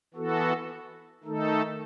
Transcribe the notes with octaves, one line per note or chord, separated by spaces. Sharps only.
E3 B3 F#4 A4
D#3 A3 D#4 A4